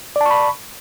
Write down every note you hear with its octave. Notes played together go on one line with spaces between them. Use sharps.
D5 A5 B5 C#6